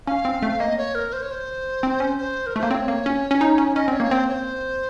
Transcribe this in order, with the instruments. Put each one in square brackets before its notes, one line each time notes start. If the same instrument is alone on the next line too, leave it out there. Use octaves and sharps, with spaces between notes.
[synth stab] C#4 [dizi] F5
[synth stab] C4
A3
[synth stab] A#3 [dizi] D#5
[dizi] C#5
A#4
C5
C#5
C5
[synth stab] C4
C#4
[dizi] C5
A#4
[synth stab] A3
[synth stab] A#3 [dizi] C5
[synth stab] C4 [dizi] C#5
[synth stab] A#3
C#4
C#4
D#4
C#4
[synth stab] C#4 [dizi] D#5
[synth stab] C4 [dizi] C#5
[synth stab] A#3
[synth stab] C4 [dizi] C5
[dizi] C#5
C5